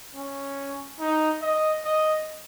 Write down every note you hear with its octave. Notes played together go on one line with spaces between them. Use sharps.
C#4
D#4
D#5
D#5